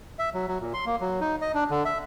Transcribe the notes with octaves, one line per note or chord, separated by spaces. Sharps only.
E5
F#3
F#3
A#2
C6
A#3
F#3
D#4
D#5
D4
D3
E5